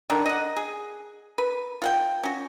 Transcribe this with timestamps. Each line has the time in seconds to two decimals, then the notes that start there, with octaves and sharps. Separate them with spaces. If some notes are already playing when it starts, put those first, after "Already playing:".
0.10 D3 D#3 D4
0.26 D#5 F#5
0.56 G#4
1.38 B4
1.82 F4 F#5 G5
2.23 C#4 F#4